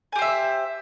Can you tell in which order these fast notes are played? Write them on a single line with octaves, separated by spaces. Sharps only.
G#5 G4 C5 E5